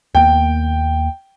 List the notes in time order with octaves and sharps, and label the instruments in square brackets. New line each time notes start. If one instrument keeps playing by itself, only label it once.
[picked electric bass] D#2 A#3 B3 [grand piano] G5